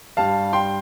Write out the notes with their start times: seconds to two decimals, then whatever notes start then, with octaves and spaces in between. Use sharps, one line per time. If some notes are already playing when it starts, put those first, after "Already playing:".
0.17 G2 G3 F5 A5
0.53 G5 C6